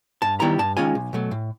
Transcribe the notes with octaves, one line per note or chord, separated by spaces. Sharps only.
G2 A5
D#3 G3 B3 E4 A#5
G2 A5
D#3 G#3 C#4 F4 G#5
B1
B2 F#3 A3
A2